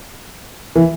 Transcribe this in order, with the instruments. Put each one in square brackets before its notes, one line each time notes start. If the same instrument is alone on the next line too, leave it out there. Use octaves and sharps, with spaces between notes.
[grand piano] E3